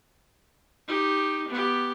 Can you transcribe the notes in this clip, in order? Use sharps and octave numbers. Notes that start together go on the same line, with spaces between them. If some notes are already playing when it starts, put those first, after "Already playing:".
D#4 G4
B3 G4